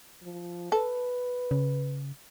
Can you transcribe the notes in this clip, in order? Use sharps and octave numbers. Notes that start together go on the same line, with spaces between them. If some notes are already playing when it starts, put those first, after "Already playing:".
F3
A4 B4
C#3